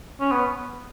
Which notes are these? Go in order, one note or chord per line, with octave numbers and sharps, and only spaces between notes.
C#4
B3